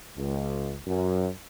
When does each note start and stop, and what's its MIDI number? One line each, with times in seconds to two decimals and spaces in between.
0.18 0.75 37
0.87 1.29 42